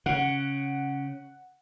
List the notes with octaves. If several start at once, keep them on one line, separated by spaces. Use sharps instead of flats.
C#3 F#5